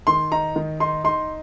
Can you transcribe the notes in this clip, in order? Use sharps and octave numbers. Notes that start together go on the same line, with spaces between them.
D#3 C6
D#4 A#5
D#3
D#4 C6
D#4 C6